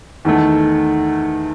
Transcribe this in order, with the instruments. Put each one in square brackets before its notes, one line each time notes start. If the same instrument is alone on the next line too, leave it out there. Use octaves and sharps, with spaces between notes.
[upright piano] E2 D#3 A3